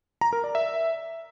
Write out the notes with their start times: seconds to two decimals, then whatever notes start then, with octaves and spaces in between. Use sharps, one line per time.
0.21 A#5
0.33 A#4
0.44 D5
0.55 E5